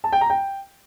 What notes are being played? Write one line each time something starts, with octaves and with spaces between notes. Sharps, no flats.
A5
G5
A#5
G5